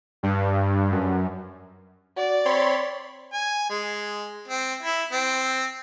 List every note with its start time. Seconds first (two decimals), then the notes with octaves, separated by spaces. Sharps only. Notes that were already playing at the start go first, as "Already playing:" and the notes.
0.23 G2
0.91 F#2
2.17 F#4 D5
2.45 C4 C#5 B5 C6
3.33 G#5
3.70 G#3
4.48 C4
4.83 E4
5.12 C4